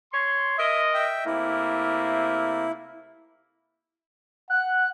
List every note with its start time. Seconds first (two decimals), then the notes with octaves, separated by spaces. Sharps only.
0.12 C#5 C6
0.58 A#4 D#5 E5
0.94 E5 G5
1.26 C3 A3 A#3 E4
4.50 F#5 F#6